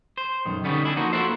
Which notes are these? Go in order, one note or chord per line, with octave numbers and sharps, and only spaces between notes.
C5
B1 F#2 D#3
D3 G3 B3 C#4 D#4
B3 D4 E4
F3 A#3 D#4 F#4
A#3 E4 F#4 A4 C5